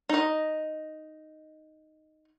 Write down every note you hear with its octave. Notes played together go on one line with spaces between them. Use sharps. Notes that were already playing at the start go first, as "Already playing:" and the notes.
D#4 D#5